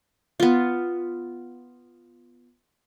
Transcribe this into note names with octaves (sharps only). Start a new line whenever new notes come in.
B3 F4